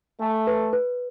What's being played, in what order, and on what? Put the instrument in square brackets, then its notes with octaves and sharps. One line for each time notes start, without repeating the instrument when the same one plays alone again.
[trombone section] A3 [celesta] G#5
[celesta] B4
B4